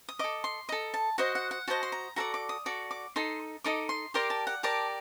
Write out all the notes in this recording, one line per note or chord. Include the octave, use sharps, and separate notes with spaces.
D#6
A4 D#5 D6
C6
A4 D#5 A#5
A5
F#4 C5 D#5 F#5
F#5
F#5
F#4 C5 D#5 A5
C6
A#5
F#4 A4 D5 A#5
D6
D#6
F#4 A4 D5 D6
D6
D#4 A4 D#5 C6
D#4 A4 D#5 D6
C6
G4 A#4 D5 C6
A5
F#5
G4 A#4 D5 A5